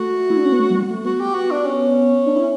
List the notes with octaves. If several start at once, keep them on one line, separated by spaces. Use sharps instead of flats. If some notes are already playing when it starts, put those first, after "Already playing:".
Already playing: A3 F#4
E4
D4
C#4
B3
A3
F#3
G3
B3
A3
B3 F#4
G4
F#4
D4
C#4
D4
E4